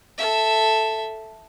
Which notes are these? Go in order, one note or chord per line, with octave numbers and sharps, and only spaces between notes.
A4 E5